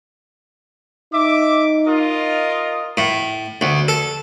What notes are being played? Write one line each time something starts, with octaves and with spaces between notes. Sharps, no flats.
D#4 E5 D6
F4 A#4 D#5
A2
D2
A4